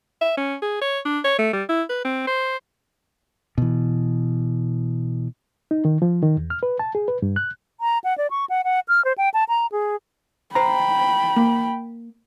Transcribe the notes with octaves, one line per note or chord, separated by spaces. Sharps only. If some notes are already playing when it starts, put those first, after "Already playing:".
E5
C#4
G#4
C#5
D4
C#5
A3
G3
E4
B4
C4
C5
B2 E3
D#4
D#3
F3
D#3
E2
F6
B4
A5
G#4
B4
G2
F#6
A#5
F#5
D5
C#6
F#5
F#5
F6
C5
G5
A5
A#5
G#4
C5 G5 A#5 B5
A#3